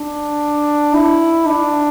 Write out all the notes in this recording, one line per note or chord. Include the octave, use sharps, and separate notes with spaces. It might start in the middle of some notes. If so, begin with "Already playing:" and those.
Already playing: D4
E4
D4